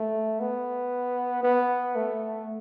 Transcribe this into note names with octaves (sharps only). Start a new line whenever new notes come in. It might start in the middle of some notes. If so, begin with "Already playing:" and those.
Already playing: A3
B3
B3
A3